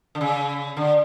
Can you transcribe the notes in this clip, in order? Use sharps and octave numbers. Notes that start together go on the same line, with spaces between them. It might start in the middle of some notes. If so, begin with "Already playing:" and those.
D3
C#3
D3